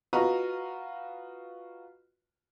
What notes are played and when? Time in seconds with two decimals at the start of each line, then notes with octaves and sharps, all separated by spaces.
0.13 F4 F#4 B4 D#5 A#5